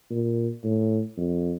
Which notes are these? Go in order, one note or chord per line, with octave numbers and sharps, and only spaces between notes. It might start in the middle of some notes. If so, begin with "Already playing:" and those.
A#2
A2
F2